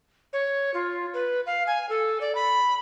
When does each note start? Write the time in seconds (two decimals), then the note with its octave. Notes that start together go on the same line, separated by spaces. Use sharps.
0.33 C#5
0.74 F4
1.14 B4
1.46 F5
1.67 G#5
1.89 A4
2.21 D5
2.35 B5